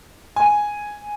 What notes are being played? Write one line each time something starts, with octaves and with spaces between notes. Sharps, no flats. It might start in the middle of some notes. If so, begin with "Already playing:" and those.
G#5